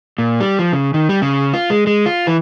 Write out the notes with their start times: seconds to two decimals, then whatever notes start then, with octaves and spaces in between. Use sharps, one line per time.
0.18 A#2
0.40 G3
0.59 F3
0.73 C#3
0.94 D#3
1.09 G3
1.22 C#3
1.54 F4
1.70 G#3
1.87 G#3
2.06 F4
2.27 E3